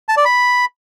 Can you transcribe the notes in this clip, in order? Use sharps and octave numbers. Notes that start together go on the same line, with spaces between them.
A5
D5
B5